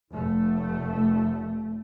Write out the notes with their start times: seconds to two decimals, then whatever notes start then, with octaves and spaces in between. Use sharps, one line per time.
0.11 F1 A3